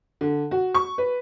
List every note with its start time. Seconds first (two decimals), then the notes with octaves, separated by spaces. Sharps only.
0.21 D3
0.51 F#4
0.74 C#6
0.98 B4